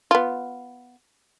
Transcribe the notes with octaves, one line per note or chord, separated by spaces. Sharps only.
B3 F4